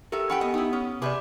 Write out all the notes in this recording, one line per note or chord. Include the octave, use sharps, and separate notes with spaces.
G4 A4 A#4 E5
C#4 G4 F#5 G5 B5
B3 D#5
D#4 E4
C#4 D#6
C3 G#4 B4 D5 B5 D6